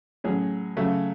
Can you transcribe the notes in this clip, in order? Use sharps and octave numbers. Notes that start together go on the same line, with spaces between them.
A2 F#3 C#4 G#4
C#3 F#3 A3 C#4